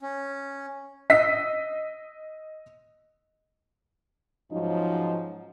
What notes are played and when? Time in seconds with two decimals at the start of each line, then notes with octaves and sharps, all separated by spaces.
0.02 C#4
1.10 D#5 E6 B6 C7
4.51 G#2 F3 F#3 C#4 D#4